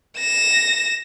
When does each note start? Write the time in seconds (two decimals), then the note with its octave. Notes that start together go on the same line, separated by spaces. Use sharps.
0.18 A#6 E7